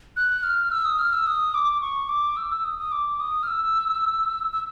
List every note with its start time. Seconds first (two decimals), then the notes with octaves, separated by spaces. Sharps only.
0.17 F#6
0.43 F6
0.71 E6
0.85 D#6
0.99 F6
1.13 E6
1.27 D#6
1.54 D6
1.81 C#6
2.09 D6
2.37 E6
2.51 E6
2.65 D#6
2.78 D#6
2.92 D6
3.20 D#6
3.43 F6
3.48 E6
4.52 E6